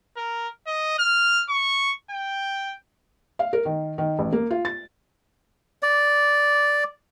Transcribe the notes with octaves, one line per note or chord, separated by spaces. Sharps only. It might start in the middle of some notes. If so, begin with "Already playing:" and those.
A#4
D#5
F6
C#6
G5
F5
A#4
D#3
D#3
A1
A#3
F4
A6
D5